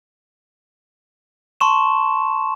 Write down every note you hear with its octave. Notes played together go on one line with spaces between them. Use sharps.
A5 C6 C#6 E7